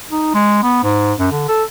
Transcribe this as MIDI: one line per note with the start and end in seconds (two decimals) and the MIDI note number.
0.11 0.31 63
0.34 0.59 56
0.63 0.80 59
0.83 1.13 44
1.19 1.30 42
1.32 1.48 50
1.49 1.64 69